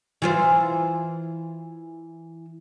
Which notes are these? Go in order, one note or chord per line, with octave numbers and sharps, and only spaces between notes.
E3 F4 C5